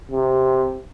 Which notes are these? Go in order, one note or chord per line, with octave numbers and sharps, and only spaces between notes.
C3